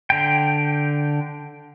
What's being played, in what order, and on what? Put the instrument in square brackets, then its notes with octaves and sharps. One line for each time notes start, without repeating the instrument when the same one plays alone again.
[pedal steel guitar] D3 G5